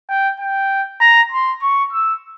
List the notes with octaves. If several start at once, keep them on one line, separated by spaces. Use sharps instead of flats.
G5
G5
A#5
C6
C#6
E6